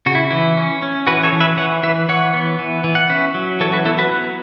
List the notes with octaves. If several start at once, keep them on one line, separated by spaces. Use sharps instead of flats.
C#3 F#4
E4
E3 E4
C#4
C#4
E3 F#4 B4
A4 C#5
E3
B4 E5
E3 C#5 F#5
E3 B4 E5
E3 C#5 F#5
B3
E3
E3
F#5
C#4 B4 E5
F#3
E3 A4 C#5
F#4 B4
B3 E4 A4
F#4 B4
F#3